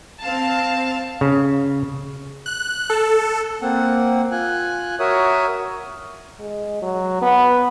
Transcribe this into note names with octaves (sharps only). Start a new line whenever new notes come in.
C4 F5 A5
C#3
F#6
A4
A#3 C4 F#5
F4 G#5 F#6
F#4 A#4 C#5 E5 D#6
G#3
F#3
B3